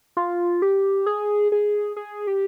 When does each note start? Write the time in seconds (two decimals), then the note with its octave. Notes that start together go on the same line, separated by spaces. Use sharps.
0.17 F4
0.62 G4
1.06 G#4
1.52 G#4
1.96 G#4
2.27 G4